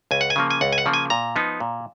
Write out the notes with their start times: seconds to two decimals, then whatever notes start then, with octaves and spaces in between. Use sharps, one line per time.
0.11 C#2 G#5
0.21 F#5
0.30 G#5
0.36 C#3 F3 A#3
0.50 G#5
0.61 C#2 F#5
0.73 G#5
0.78 F#5
0.86 C#3 F3 A#3
0.93 G#5
1.10 A#2 A#5
1.36 F3 B3 D#4
1.60 A#2